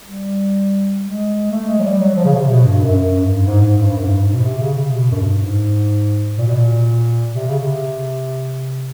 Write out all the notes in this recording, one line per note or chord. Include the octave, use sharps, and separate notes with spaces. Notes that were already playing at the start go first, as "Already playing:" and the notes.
G3
G#3
A3
G#3
F#3
G3
F#3
F3
C#3
C3
B2
G2
F#2
F#2
G2
G#2
G#2
G2
F#2
G#2
G2
G#2
B2
C3
C#3
C3
B2
F#2
G2
G#2
A#2
B2
A#2
C3
C#3
C3